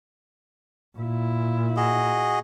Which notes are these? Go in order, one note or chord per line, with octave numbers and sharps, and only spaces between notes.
A#2 E4
F#4 G#4 D#5